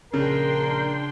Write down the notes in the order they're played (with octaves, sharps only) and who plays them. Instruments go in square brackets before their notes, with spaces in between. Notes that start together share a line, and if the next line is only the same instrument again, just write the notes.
[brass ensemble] A#1 A#4 [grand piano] C#3 [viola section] D4 G5 C6